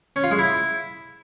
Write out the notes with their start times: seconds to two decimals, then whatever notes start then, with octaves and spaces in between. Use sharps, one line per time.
0.16 C#4
0.24 F4
0.31 G#3
0.39 E4